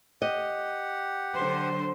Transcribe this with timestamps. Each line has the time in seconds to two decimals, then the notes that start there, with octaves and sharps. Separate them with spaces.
0.22 G4 D#5 F#5
1.36 D3 F#3 C5